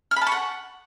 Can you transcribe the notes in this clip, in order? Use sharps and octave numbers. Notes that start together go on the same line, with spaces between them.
F6
B5
A5
C#6
F#5